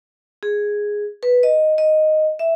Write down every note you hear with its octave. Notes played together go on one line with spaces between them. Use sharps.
G#4
B4
D#5
D#5
E5